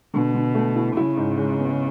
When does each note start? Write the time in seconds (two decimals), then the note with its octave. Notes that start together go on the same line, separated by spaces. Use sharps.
0.14 B2 D3
0.34 D3
0.55 A3
0.76 E4
0.96 C#3 E4
1.17 G#2
1.38 G#3
1.58 B3